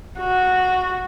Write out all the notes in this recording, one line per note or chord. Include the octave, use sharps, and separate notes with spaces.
F#4